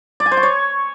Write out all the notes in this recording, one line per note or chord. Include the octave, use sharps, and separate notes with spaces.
D5
G#5
C5
C#6
C#5